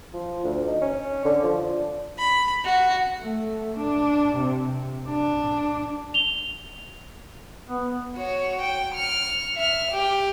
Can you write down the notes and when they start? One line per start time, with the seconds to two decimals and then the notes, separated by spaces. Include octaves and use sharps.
0.14 F3
0.44 D2
0.67 D#4
0.81 C#4
1.25 D3
1.43 F3
1.59 D4
2.18 B5
2.65 F#4
3.23 A3
3.78 D4
4.36 C3
5.08 D4
6.14 F7 G7
7.67 B3
8.16 F#4 C#5
8.61 G5
8.95 F6 C#7
9.56 E5 F6
9.91 G4